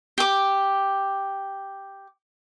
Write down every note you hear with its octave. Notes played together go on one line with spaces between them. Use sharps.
G4 D6